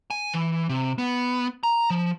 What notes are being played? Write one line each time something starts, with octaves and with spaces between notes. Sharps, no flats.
G#5
E3
C3
B3
A#5
F3